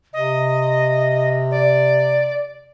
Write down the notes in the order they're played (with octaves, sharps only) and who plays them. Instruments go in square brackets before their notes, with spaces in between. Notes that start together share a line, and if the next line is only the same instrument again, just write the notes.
[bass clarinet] C3 [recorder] D#5
[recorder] D5